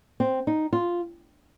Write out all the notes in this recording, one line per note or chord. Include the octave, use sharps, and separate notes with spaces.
C4
D#4
F4